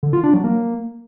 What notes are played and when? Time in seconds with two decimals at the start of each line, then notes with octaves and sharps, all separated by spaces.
0.03 D3
0.13 F4
0.23 D4
0.34 F#3
0.44 A#3